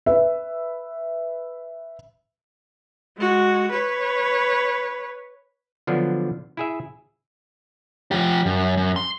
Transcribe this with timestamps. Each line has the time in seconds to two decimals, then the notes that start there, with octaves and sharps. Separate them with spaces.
0.06 B4 E5
3.18 G#3 F#4
3.72 B4 C#5
5.87 D3 F3 F#3 B3 D4
6.57 E4 G#4 E5
8.11 F3 G4
8.46 F#2
8.77 F#2
8.96 C6